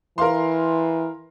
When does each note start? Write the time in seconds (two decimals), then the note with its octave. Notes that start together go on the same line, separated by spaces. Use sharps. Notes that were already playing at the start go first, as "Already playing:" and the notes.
0.18 E3 A#4 F5 C6